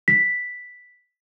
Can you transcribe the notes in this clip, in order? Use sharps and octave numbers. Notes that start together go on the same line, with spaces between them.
B6